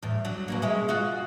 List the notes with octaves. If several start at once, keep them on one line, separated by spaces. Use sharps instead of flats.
E2 A2
F#3 D4
B2 F#3 A#3
G#3 C#4 E5
B2 F4 F#4